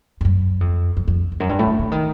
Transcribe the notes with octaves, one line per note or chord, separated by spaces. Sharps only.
G2
F#2
F2
F2
F2
E2
F#2
G2
A2
D3
D3
D#3